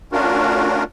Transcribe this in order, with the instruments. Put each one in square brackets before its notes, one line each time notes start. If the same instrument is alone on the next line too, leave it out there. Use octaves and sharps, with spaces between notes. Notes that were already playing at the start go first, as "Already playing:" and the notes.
[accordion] A3 C#4 D4 F4 F#4 A#4